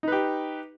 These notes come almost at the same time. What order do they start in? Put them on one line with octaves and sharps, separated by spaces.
D#4 B4 G4